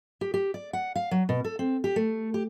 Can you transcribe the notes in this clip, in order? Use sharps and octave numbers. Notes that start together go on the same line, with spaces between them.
G4
G4
D5
F#5
F5
F#3
B2
A4
C4
G4
A3
G4